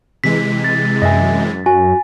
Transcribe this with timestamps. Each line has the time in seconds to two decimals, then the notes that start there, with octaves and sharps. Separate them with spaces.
0.24 C3 E3 G#3 B6
0.64 A6
1.02 F#2 D#5 E5 G#5
1.66 F#4 G#5